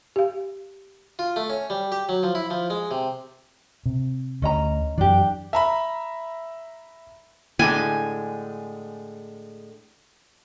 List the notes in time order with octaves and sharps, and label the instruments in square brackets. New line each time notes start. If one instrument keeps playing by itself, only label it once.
[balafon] G4 F5
[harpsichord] F4
A3
C#4
G3
G4
F#3
F3
E4
F3
G#3
C3
[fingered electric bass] C3
[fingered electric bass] D2 [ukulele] C#4 D#5 A#5
[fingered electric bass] F#2 E3 [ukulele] D4 G4
[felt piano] E5 A#5 B5
[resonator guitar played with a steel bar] A2 D3 G#3 [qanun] G#5